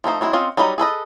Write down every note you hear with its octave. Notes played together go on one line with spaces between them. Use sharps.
F3 A3 D#4 C5
F#3 G#3 C4 E4
C4 C#4 F4 C5 D#5
F#3 G3 D#4 D#5 B5
G#4 A4 B4 D#5